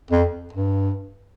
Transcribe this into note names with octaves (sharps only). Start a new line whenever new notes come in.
F2
G2